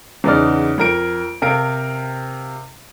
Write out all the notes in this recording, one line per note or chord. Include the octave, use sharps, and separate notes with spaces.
E2 C#3 B3 D#4 D5 F6
F2 A#4 D7
C3 A#4 F5 D7